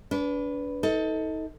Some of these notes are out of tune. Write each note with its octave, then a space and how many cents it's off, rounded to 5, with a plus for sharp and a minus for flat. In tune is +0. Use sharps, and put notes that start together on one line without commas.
D4 -35 B4 +0
D#4 +30 A4 +10